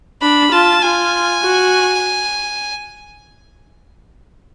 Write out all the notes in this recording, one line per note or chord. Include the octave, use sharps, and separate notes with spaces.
D4 B5
F4 A5
F4 G#5
F#4